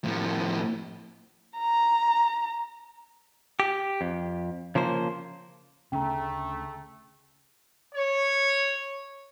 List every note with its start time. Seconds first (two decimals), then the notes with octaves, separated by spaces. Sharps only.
0.04 A2 F3
1.57 A#5
3.60 G4
4.01 F2
4.75 C#3 F3 A#3 C5
5.92 D2 C#3 A3 C#4 G5 A#5
7.95 C#5